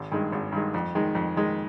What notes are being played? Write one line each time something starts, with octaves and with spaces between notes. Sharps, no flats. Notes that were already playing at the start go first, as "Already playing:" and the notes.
Already playing: G#1
G2 D#3 G#3
G#1
G2 D#3 G#3
F2
D#3 G#3
F2
D#3 G#3